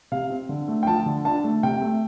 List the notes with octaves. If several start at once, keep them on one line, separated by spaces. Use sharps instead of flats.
C3 F5
C4
D3
A3
G5
F3 A5
D3
D4 A5
A3
C3 G5
A3